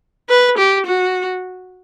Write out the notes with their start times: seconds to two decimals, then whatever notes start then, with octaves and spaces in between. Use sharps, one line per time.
0.29 B4
0.58 G4
0.86 F#4